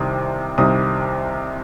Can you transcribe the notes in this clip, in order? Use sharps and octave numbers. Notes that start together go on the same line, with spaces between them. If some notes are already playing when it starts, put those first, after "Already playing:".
Already playing: C2 C3 D#3 G3 D#6
C2 C3 D#3 G3 D#6